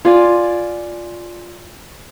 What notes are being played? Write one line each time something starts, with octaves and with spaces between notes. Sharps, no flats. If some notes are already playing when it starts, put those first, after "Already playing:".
F4 D5 G#5